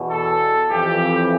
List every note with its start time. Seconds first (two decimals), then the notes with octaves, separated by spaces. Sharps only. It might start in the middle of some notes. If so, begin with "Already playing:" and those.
Already playing: E2 B2
0.10 A4
0.69 F2 E3 G4